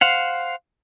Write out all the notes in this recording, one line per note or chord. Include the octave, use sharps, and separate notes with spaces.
C5 F5 F#5